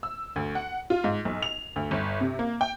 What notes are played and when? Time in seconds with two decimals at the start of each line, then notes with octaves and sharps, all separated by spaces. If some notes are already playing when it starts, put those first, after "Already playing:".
0.03 E6
0.36 D2
0.55 F#5
0.90 F4
1.04 G#2
1.25 B1
1.43 F7
1.76 D2
1.91 G1
2.20 C3
2.39 A#3
2.61 G5